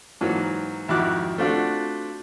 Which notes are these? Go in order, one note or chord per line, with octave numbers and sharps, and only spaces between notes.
G#2 E3 F#3 A#3
G#1 F2 E4 F#4 D6 F#6
A3 C4 D4 F4 F#4 A4